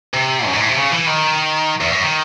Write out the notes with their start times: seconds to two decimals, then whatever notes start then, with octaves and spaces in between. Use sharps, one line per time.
0.14 C3
0.46 F#2
0.53 G#2
0.61 A2
0.69 C3
0.76 C#3
0.92 E3
1.07 D#3
1.81 E2
1.91 F#2
2.02 D#3